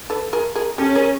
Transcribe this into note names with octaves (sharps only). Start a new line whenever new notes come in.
A4 B4
G#4 A#4
G#4 A#4
C#4 G4 A4
G#4 A#4